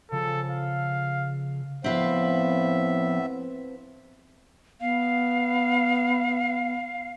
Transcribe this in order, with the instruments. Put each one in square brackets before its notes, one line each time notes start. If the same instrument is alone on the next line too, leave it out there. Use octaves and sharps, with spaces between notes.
[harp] C#3 F3 [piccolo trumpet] A4
[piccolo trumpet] F5
[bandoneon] A2 E5 [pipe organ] F3 B3 [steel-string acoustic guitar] C4 B4 F5
[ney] B3 [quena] F5